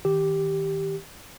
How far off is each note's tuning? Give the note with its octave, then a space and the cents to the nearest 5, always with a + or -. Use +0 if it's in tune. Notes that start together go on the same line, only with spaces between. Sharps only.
D#3 +20 G4 +0